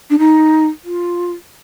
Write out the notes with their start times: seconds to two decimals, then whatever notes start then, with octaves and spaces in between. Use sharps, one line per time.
0.10 D4
0.19 D#4
0.85 F4